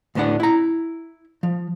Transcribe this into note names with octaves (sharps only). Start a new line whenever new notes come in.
D2 A2 B3 D4 F#5
E4 A#5
F3